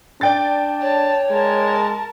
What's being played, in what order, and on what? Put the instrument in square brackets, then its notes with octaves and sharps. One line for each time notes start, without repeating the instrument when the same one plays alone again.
[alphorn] D4 [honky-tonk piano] D5 G5 A6
[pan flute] C#5 [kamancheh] A5
[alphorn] G#3 [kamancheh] A#4 A5